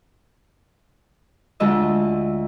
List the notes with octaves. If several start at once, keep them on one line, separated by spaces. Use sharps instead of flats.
D2 G#3 F4 D#5 E6